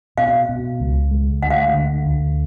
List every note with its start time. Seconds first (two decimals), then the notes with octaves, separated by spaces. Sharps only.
0.18 B2 F5
0.49 B2
0.80 C#2
1.11 G#3
1.42 D2 F#5
1.50 F5
1.58 F#5
1.74 D3
2.05 D2